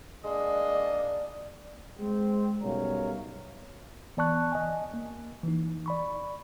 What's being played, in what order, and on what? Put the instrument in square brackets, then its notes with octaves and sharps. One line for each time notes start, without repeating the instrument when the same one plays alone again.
[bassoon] G#3 [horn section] A#3 D4 D#5 [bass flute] D5
[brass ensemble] G#3 C4
B1 F#2 G3 C#5 F5 A#5
[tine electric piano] E3 B3 D5 A5 C#6 F#6
D#5 G#5
A#3
E3 D#4
D5 B5 C#6